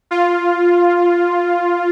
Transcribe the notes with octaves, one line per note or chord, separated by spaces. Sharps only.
F4